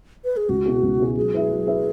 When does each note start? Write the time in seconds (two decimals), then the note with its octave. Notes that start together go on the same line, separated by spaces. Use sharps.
0.25 B4
0.37 G#4
0.49 C#2 F#4
0.66 B2 B3 E4 G#4
0.83 C#2
0.99 B2 B3 E4 G#4
1.17 F#3 G#4
1.34 E4 B4 E5
1.50 F#3
1.67 E4 B4 E5